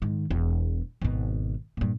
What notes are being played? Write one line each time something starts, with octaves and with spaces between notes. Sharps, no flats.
G#2 D#3
E1 E2
G#1 B2
G2 A#2